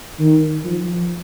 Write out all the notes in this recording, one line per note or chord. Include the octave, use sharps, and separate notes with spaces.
D#3
F3